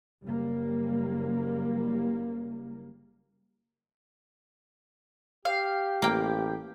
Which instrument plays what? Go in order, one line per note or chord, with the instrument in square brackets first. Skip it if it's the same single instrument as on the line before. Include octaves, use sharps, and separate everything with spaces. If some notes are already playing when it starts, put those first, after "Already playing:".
[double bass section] F#1 G3 A#3
[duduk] G4 [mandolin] F5
[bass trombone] A1 [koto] A#3 G5